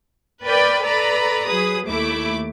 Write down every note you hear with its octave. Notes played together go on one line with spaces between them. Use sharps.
A#4 B4 D5 G5 B5
A4 B4 D5 A#5 B5
F#3 G#4 B4 D#6
D#2 A3 E4 D6